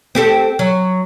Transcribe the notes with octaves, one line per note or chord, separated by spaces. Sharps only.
C4 G4 A4
F#3